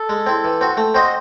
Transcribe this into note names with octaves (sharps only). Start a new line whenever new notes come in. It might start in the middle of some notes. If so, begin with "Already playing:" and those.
Already playing: A4
G#3
C4 E4
E3
C4 F#4
A3
C4 F#4 C5 D#5